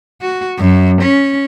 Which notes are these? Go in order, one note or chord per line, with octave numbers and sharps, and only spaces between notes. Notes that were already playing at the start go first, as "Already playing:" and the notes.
F#4
F#2
C#4